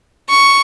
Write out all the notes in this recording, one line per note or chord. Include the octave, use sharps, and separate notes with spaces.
C#6